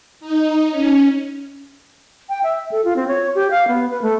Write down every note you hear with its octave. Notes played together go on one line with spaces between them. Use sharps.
D#4
C#4
G5
E5
A4
F4
C4
C#5
G4
F5
B3
B4
A3